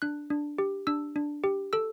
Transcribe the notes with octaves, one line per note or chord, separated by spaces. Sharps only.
D4 F#6
D4
G4
D4 E6
D4
G4
A4 E6